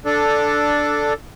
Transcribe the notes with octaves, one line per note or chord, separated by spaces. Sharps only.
D4 A4